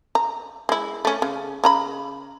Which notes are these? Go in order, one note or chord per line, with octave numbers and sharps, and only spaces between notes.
A#5
G#3 E4
A3 C#4
C#3
C#3 A#5 B5